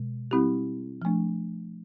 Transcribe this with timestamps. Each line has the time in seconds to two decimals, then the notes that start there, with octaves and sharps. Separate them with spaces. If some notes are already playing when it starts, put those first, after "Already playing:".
Already playing: B2 G#3
0.31 G3 C4 E4 G4
1.02 F3 A3 D4